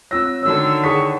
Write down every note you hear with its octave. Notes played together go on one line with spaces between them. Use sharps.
C4 F4 C#5 E6 A#6
D3 D#3 F#4 C#5 E6
E4 G#4 C#5 F#5 C#6 D#6 B6